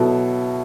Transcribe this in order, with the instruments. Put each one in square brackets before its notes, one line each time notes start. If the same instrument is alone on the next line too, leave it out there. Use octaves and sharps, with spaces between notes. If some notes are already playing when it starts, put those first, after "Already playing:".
Already playing: [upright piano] B2 F#3 B3 E4 A4